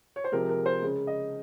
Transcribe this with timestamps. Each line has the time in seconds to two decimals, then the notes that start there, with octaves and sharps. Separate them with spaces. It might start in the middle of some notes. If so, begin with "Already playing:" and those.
0.16 C#5
0.24 C5
0.32 C3 F3 G#3 A#4
0.49 A#4
0.66 C5
0.82 C#3 G#3
1.07 D#5